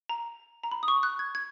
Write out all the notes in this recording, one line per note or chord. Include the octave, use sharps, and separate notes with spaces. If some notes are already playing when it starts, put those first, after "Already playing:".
A#5
A#5
B5
D#6
C#6
F#6
G#6
G#6